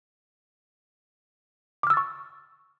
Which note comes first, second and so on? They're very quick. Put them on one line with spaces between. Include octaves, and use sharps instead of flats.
D6 F6 E6 A6 C#6